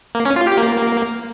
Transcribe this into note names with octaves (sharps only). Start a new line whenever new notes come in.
A#3
C#4
F4
G4
A#3